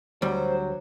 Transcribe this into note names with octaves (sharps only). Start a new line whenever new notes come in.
D2 F#3 G3 C5